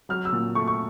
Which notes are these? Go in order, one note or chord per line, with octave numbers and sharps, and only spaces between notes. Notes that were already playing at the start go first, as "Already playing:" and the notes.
F#3 F6
E6
A#2
A3 C#6
C#6